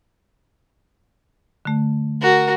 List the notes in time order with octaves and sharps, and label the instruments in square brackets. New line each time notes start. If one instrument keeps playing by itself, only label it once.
[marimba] D3 A3
[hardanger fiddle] F#4 A#4